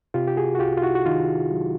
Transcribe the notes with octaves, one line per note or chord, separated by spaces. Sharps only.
C3 F4 G4
G4
F#4 G#4
F#4
C2 F4 G4
F4
E4 F#4
F#4
D#3 D#4 F4
F#3